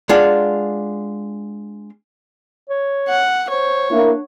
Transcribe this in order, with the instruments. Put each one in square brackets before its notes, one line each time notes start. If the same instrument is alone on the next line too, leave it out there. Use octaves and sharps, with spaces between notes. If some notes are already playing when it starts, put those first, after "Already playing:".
[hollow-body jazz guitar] G#3 D4 F4 F#5
[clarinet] C#5
[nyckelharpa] F#5
[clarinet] C5 [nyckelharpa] C#5
[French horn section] A#3 E4 [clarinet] D4